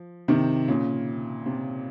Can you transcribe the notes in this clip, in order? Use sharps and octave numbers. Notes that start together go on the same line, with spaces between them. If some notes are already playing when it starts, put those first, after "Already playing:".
Already playing: F3
C3 D#3
A#2 C#3
C3